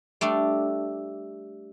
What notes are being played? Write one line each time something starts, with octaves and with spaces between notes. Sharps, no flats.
G3 A3 D4